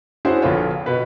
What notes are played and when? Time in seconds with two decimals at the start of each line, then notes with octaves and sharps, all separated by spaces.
0.25 C#4 D4 E4 F#4 G#4 C5
0.42 A#1 D3 B3 F4 C#5
0.86 B2 B4